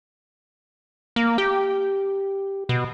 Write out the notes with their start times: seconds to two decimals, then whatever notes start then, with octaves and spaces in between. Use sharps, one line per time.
1.16 A#3
1.38 G4
2.69 B2